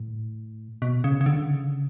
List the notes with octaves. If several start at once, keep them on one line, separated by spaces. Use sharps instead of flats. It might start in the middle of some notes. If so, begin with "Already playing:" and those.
Already playing: A2
B2
C#3
C#3
D3
C#3